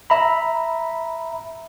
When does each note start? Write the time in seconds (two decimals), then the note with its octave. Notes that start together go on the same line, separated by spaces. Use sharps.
0.10 E5 A#5 B5